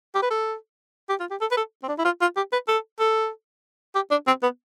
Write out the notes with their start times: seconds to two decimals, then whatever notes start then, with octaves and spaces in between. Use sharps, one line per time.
0.15 G4
0.23 B4
0.30 A4
1.09 G4
1.20 F4
1.31 G4
1.41 A4
1.51 B4
1.57 A4
1.83 C4
1.88 D4
1.99 E4
2.05 F4
2.21 F4
2.36 G4
2.52 B4
2.68 A4
2.99 A4
3.95 G4
4.11 D4
4.27 C4
4.43 B3